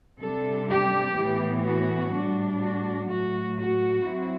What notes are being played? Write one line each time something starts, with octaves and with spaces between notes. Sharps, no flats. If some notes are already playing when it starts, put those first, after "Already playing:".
C3 G3 D4 A4
G4
A2 E3 B3
F#4
A2 G3 D4
F#4
A2 F#3 A3 F#4
F#4
F#3 C4 E4